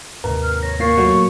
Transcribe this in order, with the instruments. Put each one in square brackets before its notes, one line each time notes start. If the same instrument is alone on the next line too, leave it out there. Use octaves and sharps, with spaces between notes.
[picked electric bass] D#2 G#2 C3 [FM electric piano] A#4 [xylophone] B4
[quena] F6
[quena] C#5 [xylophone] A#6
[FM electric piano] A#2 C7 [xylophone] A#4 F5 [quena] C#6
[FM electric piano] A#2 F#3 A3